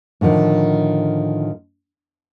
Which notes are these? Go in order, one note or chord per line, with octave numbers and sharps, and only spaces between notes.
A2 D3 D#3 F3